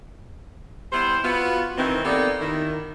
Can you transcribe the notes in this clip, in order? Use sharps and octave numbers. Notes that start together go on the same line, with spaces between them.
G3 B3 E4 C5
B3 F4 F#4
D#3 E3 C4
A#3 B3 D#4 G4 A4 D5
D#3 E4